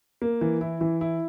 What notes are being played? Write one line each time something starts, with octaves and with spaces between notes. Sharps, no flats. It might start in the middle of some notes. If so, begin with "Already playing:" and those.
A#3
E3
E4
E3
E4